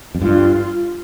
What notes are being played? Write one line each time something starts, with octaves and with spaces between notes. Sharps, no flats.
F2
G2 F4